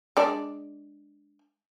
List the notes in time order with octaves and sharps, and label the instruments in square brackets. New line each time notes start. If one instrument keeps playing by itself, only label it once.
[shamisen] G#3 D4 D5